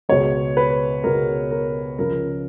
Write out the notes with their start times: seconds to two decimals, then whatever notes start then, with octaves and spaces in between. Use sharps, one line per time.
0.09 C#2 B2 G#3 B3 C#5
0.57 B4
1.04 C#2 B2 G#3 B3 A#4
1.51 A#4
1.99 C#2 C#3 F3 A#4